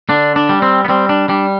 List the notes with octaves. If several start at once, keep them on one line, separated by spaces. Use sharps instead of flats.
D3 D4
D4
G3
C4
B3
G3 C4
D4
G3 D4